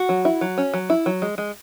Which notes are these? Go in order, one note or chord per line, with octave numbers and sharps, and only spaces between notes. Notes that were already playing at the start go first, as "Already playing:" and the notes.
Already playing: F#4
F#3
E4
F#3
C#4
F#3
E4
F#3
G#3
G#3